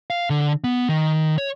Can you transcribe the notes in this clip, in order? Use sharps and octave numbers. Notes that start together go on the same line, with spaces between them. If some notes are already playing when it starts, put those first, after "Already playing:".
F5
D3
B3
D#3
C#5